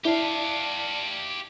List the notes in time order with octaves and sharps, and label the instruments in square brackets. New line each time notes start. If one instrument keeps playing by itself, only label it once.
[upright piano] E4 [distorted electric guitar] G4 F5 [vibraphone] D5 A5 D6